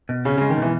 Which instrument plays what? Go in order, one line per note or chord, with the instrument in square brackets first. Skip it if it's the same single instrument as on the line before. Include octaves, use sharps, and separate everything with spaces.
[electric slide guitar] B2
[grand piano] C#3 [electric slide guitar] C#4
[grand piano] C#3
[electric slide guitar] G#3
[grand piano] D#3
[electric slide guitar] B2 [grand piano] E3